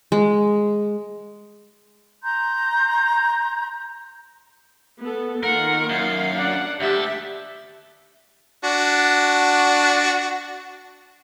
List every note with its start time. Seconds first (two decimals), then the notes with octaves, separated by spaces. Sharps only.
0.12 G#3
2.23 A#5 C6 G6
5.02 B3 A4
5.43 D#3 A#3 F4 A#4 F#5
5.89 F#2 F5
6.36 D4 D5 F#5
6.80 D2 G4 A4 E5
8.64 D4 F#4